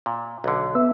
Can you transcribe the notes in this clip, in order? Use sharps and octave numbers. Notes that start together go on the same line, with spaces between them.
A#2
B1 D3
B3 E5